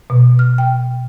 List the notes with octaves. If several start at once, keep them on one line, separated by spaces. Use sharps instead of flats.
B2
F6
G5